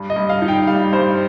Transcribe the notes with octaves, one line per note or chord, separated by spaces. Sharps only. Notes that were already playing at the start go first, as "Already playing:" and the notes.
Already playing: G2
D#5
G2
F5
D#4
G5
G3 F5
G2 C5